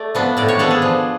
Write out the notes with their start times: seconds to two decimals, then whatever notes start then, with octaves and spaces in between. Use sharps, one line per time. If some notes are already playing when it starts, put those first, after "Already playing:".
Already playing: A3 D5
0.15 F3 B3 D4
0.37 A2 D5
0.48 C#5
0.59 F3 B3 D4 A4
0.71 G#4
0.82 F3